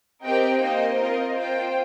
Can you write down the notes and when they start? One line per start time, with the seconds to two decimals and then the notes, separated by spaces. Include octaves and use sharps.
0.24 C4 G4 A#4 D#5 G5
0.61 A#3 D#4 C5 D#5
1.00 C4 F4 A#4 D#5
1.37 F4 C5 G5